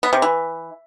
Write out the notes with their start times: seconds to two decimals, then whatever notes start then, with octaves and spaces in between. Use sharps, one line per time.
0.03 B3
0.13 C3
0.22 E3